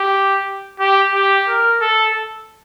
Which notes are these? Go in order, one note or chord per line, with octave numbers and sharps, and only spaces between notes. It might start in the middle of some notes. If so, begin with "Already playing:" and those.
Already playing: G4
G4
G4
A#4
A4